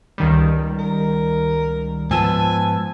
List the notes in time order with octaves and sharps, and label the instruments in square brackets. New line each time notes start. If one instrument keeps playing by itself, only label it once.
[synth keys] C#2 D#3 G3
[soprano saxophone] A#4
[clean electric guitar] G#2 F3 B3 [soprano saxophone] G#5 [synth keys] A5 E6